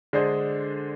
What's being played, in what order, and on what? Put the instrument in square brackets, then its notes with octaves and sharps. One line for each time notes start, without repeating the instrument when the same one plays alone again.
[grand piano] D3 G#3 D4 G#4 C5